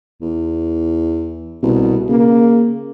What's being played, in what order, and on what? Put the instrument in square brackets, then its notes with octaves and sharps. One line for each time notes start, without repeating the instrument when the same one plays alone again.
[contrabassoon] E2
[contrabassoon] C2 [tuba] B2
[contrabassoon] C#3 [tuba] A#3